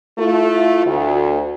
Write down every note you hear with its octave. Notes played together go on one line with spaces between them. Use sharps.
A3 E4 F4
D2